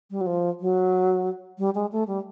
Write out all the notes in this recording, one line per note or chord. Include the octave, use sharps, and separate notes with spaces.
G3
F#3
F3
F#3
G3
G#3
A3
G3